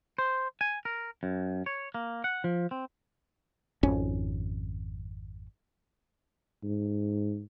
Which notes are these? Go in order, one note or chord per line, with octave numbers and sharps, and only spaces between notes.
C5
G#5
A#4
F#2
C#5
A#3
F#5
F3
C4
G#1 F2 C#4
G#2